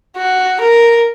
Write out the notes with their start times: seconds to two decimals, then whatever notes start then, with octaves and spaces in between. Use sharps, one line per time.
0.17 F#4
0.60 A#4